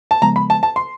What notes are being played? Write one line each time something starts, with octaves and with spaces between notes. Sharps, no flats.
A5
C#3 F3 G#3 B3 A#5
B5
A5
A5
C6